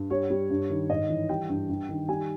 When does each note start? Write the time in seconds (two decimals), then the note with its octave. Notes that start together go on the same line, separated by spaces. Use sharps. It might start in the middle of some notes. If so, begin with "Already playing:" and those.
Already playing: G2
0.10 G3 C#5
0.30 G3
0.50 G2
0.70 D#3
0.90 G#2 D#5
1.09 E3
1.29 G3 G5
1.49 G2
1.69 G2
1.89 D#3
2.09 G3 G#5